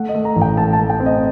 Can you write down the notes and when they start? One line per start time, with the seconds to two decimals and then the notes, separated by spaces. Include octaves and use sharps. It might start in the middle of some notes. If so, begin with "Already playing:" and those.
Already playing: A3 F#5
0.09 D#5
0.15 A3
0.25 A#5
0.36 A1
0.42 G5
0.57 A3 A5
0.73 A5
0.79 A3
0.90 G5
1.00 C4
1.06 D#5